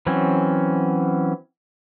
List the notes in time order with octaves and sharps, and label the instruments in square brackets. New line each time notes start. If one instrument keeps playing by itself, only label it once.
[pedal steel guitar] E3 F#3 C4 C#4